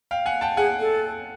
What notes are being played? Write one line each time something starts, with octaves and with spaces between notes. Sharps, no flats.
F5 G5
F#5 G#5
G5 A5
G#4 F#5 G#5
A4